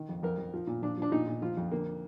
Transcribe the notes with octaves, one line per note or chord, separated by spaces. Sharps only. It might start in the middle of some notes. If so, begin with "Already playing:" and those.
Already playing: D#3
F2
F2 A#4
F2
F3
A#2
F3 D4
F3 D4
A#2 D#4
A#2
F3 F4
F2
D3 A#3